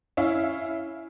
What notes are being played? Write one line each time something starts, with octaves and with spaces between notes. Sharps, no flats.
C#4 E4 E5 F5